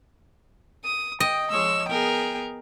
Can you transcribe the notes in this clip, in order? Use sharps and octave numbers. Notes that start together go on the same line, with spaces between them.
D#6
D#5 G5
F3 G#3 C#5 E6
B3 G#4 A#4 G5